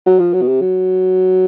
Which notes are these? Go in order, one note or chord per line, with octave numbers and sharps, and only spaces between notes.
F#3
F3
F#3
B2
C3
F#3